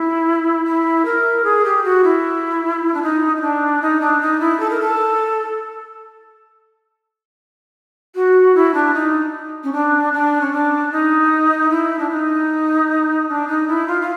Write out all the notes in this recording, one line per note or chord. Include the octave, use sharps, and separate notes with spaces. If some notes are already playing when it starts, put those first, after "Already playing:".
Already playing: E4
E4
A#4
G#4
G4
F#4
E4
D4
D#4
D#4
D4
D#4
D4
D#4
E4
A4
A#4
A4
F#4
E4
D4
D#4
C#4
D4
D4
C#4
D4
D#4
E4
D4
D#4
D4
D#4
E4
F4
F4